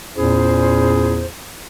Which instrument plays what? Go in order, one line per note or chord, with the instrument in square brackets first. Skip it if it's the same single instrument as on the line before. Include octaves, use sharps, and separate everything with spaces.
[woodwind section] E2 A#2 C#4 E4 G#4 C5